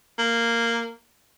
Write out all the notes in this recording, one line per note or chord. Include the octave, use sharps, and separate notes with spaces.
A#3